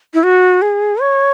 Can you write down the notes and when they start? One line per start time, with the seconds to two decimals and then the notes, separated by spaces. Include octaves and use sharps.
0.14 E4
0.23 F#4
0.62 G#4
1.01 C#5